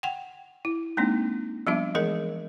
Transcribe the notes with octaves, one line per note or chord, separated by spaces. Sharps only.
F#5 G5
E4
G#3 A#3 C4 D4 D#4
F3 G3 B3 D4 F4 E5
E3 G#3 G#4 A#4 D#5